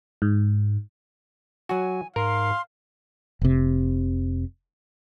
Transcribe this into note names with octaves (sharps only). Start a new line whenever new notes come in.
G#2
F#3 F#4 G#5
G#2 A#4 F5 C6
F1 C3